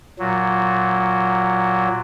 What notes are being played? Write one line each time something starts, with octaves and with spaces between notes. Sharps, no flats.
A#2 F#3